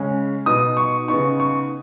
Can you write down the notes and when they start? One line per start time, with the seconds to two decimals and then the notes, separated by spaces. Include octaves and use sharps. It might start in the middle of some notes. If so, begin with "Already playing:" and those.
Already playing: C#3 G#3 C#4
0.46 B2 B3 D#4 D#6
0.77 C#6
1.08 C#3 B3 D#4 C#6
1.40 C#6